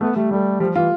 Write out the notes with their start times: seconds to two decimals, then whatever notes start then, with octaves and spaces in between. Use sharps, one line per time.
0.01 A3 B3
0.16 G3 A3
0.31 G3 A3
0.60 F3 G3
0.75 E3 F4